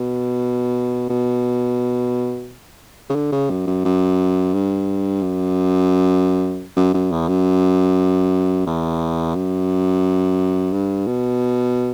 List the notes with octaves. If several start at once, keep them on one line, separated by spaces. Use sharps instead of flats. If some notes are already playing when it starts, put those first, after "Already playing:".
Already playing: B2
B2
C#3
D3
C#3
F#2
F#2
F#2
G2
F#2
F#2
F#2
E2
F#2
E2
F#2
G2
B2